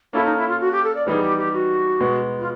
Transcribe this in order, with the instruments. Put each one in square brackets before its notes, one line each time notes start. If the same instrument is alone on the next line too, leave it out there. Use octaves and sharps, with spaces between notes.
[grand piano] A#3 C#4 F4 A4 [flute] E4
[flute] D#4
E4
F4
F#4
G4
A4
D5
[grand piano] E3 G3 B3 D#4 [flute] G#4
[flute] G4
G4
F#4
[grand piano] B2 G#3 B3
[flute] F4